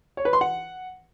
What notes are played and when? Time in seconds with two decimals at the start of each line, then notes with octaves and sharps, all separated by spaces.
0.17 C#5
0.25 B4
0.33 C6
0.41 F#5